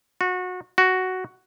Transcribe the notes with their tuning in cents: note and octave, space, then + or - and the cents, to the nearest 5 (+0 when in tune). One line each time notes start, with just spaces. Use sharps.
F#4 -25
F#4 +5